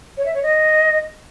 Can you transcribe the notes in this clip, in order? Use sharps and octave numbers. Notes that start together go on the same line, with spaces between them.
C#5
E5
C#5
D#5